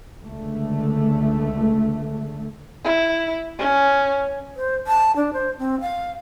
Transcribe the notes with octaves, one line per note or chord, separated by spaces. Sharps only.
C#2 D3 A3
E4
C#4
C5
A5
D4
C5
C4
F5